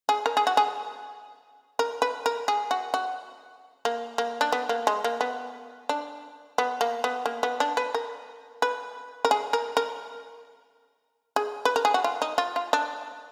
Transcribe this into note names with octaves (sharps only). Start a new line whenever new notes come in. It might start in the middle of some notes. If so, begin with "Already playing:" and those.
G#4
A#4
G#4
F#4
G#4
A#4
B4
A#4
G#4
F#4
F#4
A#3
A#3
D4
B3
A#3
G#3
A#3
B3
D4
B3
A#3
B3
A#3
B3
D4
B4
A#4
B4
A#4
G#4
A#4
A#4
G#4
B4
A#4
G#4
F#4
F4
D#4
F4
F4
D4